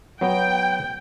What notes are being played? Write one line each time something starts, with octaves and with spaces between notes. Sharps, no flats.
F#3 B3 G5